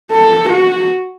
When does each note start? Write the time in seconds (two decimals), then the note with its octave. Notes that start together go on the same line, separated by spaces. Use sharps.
0.12 A4
0.50 F#4